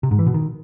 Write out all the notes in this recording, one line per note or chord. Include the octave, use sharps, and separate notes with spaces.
C3
G#2
E3
B2
D#3